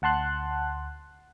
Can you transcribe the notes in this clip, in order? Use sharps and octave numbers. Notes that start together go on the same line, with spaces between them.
D2 F#5 A5 C6 F#6